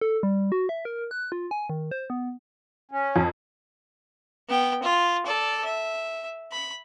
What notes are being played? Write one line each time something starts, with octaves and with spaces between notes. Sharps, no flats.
A4
G3
F#4
E5
A#4
F#6
F4
G#5
D#3
C5
B3
C#4
F2
B3 G5
F4
A4 D5
E5
B5